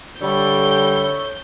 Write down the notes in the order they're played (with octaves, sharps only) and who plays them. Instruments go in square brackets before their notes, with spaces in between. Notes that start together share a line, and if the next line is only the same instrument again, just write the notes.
[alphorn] D3 [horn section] G3 [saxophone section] E4 A4 C#5 [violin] G6